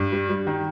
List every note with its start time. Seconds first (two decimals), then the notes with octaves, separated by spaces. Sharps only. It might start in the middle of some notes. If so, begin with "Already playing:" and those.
Already playing: G2
0.12 G3
0.29 G3
0.47 D#3